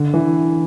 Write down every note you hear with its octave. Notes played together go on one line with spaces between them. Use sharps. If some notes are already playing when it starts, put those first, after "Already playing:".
Already playing: D3
E3